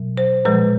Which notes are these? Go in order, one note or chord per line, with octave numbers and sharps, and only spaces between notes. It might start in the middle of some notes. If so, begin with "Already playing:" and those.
Already playing: B2 F#3
C5
A#2 F3 G#3 B4